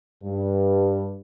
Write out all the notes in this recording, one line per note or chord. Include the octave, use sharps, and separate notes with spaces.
G2